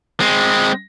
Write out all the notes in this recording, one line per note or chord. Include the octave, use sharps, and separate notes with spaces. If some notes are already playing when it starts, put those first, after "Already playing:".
G#3 C4